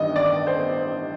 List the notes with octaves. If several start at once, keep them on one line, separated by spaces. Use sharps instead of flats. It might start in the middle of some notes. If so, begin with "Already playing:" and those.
Already playing: A1 G2 D#3 D#5
D5
C5